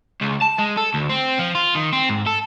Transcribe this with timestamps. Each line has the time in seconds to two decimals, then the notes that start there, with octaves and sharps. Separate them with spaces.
0.22 C#2
0.42 A5
0.59 G#3
0.77 A4
0.94 D2
1.09 C4
1.39 F3
1.55 F4
1.75 D#3
1.93 C4
2.09 G#2
2.27 A4